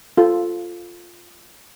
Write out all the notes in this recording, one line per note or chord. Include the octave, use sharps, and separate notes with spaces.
F4 A4